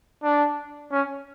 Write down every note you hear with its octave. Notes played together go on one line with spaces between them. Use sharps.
D4
C#4